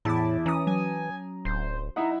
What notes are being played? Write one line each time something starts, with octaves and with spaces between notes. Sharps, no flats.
E2 A2 E4 A5 D6
E3 C#4 A#5 D#6
F#3 G#5
D1 C5
D#4 E4 E5 F#5